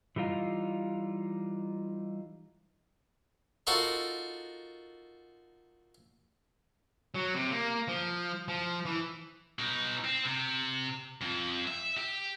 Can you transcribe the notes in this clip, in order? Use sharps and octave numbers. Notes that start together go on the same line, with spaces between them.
E3 G3 D#4 F4
D#4 F4 F#4 A4 A#4
F#3
C3
A#3
F3
F3
E3
B2 D#4
C4
C3
F2
E5
G4